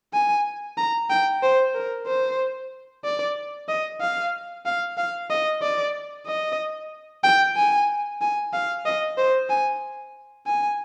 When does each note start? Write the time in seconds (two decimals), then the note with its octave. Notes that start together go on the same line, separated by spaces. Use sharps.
0.13 G#5
0.78 A#5
1.10 G5
1.43 C5
1.75 A#4
2.07 C5
3.04 D5
3.68 D#5
4.01 F5
4.66 F5
4.98 F5
5.30 D#5
5.62 D5
6.27 D#5
7.23 G5
7.56 G#5
8.21 G#5
8.53 F5
8.85 D#5
9.18 C5
9.50 G#5
10.47 G#5